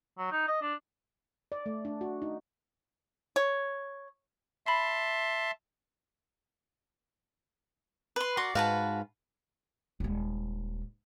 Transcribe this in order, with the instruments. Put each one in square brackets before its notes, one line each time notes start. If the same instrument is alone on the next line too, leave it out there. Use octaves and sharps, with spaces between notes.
[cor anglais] F#3
D#4
D#5
D4
[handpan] D5
A3
D4
F#4
D#4
[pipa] C#5
[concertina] E5 A5 C6 [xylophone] B5 C7
[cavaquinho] B4 C6
[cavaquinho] F#4 D5 C6 [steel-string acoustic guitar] A#4
[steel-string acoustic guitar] G#2 F5 [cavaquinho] F#4 B4 A5
[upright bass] D#1 G#3